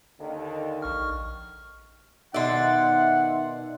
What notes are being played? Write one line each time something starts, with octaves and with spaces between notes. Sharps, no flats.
D#2 D3 D#3
A#1 C#6 F6
B2 D#3 D5 E5 F#5 C6